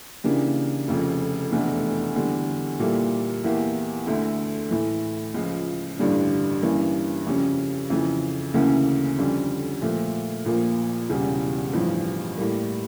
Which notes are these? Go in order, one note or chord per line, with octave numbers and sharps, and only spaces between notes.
C#3 E3 A#3 D4 G4
F1 F2 C#3
F1 E2 E3 A3 D4
E2 D3 G3
A#2 G3 A#3 E4 A4
E2 E3 A#3 E4 G4
D2 D3 A3 E4
A2 E3 A3
C#2 C#3 F3
A1 G2 D3 G3 D4
G2 E3 A#3 C#4
F2 C#3 G3 C#4
F2 C#3 E3
D2 C#3 E3 A#3 C#4
F2 D3 G3 C#4
A#2 F3 A3
A#1 A#2 F3 A#3
E1 E2 C#3 G3
A1 G2 F3
A2 G3 A#3